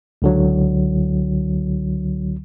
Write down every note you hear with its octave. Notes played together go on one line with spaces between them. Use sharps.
C#2 D3 F#3